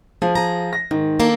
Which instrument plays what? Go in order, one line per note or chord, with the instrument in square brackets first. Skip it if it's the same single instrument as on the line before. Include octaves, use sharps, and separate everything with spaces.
[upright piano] F3 [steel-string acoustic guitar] G#4
[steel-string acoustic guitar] G#4 A#5
[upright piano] A#6
[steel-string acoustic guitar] G#2 [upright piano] D#3
[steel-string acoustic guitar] A#3 D4 A4